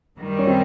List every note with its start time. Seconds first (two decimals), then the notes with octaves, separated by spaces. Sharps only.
0.19 F#2 D#3 G3
0.39 C#4
0.47 C4